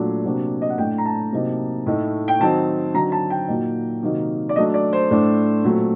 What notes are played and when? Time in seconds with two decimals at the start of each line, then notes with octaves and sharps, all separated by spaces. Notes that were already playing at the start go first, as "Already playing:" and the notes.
Already playing: A#2 F#3 A3 D4
0.24 C3 F#3 A#3 D4
0.62 D#5
0.70 F#5
0.78 A2 A3 D4 G5
0.98 A#5
1.06 A5
1.32 C3 F#3 A#3 D#4
1.86 A2 A3 D#4
2.28 G5
2.40 D#3 F#3 C4 D#4 A5
2.94 D3 F#3 C4 D#4 A#5
3.12 A5
3.30 G5
3.48 A#2 F#3 A#3 D#4
4.02 C3 D#3 F#3 A#3 D#4
4.49 D5
4.56 F#3 A3 D4 D#5
4.74 D5
4.93 C5
5.11 A2 A3 D4
5.64 A#2 F#3 A3 C4